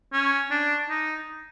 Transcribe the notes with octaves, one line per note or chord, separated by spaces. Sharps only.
C#4
D4
D#4